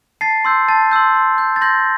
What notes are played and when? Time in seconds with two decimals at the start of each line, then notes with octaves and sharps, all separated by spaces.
0.21 A5 A6 C7
0.45 C6 E6 G6
0.68 A5 A6
0.91 C6 E6 G6
1.15 C6
1.38 G6
1.56 A6
1.61 C6 G6 A#6